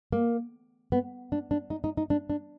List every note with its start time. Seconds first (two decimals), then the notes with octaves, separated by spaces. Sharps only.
0.12 A#3
0.92 B3
1.32 D4
1.51 D4
1.70 D#4
1.84 D#4
1.97 D#4
2.10 D4
2.30 D4